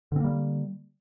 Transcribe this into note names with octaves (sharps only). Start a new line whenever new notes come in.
D3 G3 A#3 C4